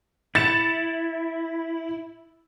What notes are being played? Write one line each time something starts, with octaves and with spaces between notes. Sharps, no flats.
E4 A6 C#7 E7